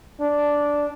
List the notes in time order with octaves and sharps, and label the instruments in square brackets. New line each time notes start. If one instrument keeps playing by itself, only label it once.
[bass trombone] D4